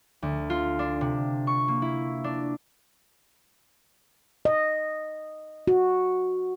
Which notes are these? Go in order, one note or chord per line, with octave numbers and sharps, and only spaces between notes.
D2
F4
D4
C3
C#6
A#3
E4
D4
D#5
F#4